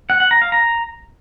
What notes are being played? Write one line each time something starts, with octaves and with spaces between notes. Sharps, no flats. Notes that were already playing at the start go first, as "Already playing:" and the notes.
F#5
F#5
A#5
F5
A#5